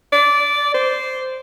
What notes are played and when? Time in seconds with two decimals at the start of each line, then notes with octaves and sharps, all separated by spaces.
0.12 D5
0.74 C5